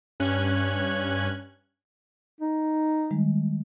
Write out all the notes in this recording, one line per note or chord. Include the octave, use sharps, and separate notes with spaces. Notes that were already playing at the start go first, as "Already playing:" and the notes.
G2 C#4 F#6 G#6
D#4
D#3 G3 G#3